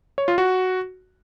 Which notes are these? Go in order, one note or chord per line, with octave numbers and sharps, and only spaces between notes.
C#5
F4
F#4